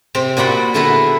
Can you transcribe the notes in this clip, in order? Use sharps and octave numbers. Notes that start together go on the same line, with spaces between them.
C3 C4
A#2 F#4 D5 F#5 B5 C6
D3 B3 E4 G#4 A#4 B4